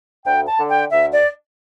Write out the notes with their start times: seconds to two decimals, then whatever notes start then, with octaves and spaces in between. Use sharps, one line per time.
0.24 D2 G5
0.47 A5
0.58 D3
0.69 G5
0.91 D2 E5
1.12 D5